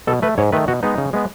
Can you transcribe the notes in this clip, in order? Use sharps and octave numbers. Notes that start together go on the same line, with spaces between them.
B2 A4
A3 B4
G#2 C#5
D#3 A3 B4
B2 F#4
G#3 B3 D#4
C#3
G#3 B3